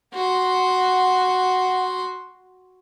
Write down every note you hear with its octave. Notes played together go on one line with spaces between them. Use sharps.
F#4 F#5 C6